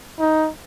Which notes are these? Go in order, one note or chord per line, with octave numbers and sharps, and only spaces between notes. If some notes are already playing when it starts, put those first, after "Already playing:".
D#4